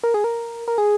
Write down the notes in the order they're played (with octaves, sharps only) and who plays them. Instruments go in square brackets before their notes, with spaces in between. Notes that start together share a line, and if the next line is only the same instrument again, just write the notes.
[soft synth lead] A#4
G#4
A#4
A#4
G#4